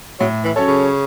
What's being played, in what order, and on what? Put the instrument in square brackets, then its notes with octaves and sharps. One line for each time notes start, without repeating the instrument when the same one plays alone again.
[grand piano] A2 [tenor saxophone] F#3
[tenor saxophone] E3
[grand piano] F#3 C#4 A4 C#5
[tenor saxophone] C#3